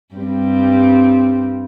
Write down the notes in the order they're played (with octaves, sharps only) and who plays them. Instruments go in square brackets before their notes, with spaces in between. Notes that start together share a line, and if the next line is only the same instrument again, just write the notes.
[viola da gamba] G2 G3 C4